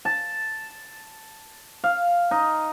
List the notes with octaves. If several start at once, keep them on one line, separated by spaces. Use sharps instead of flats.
A5
F5
D#4